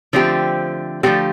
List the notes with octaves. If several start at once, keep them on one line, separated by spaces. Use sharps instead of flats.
D3 F3 A3 C4 G4
D3 F3 A3 C4 G4